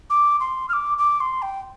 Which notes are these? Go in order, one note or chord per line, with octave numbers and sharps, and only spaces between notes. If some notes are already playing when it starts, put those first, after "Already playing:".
D6
C6
F6
D6
D6
C6
G5